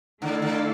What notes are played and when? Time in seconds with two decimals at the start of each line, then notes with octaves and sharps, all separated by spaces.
0.21 D3 A3 E4 A4 D5 F5
0.42 D3